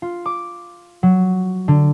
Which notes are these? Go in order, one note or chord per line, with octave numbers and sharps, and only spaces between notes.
F4
D6
F#3
D3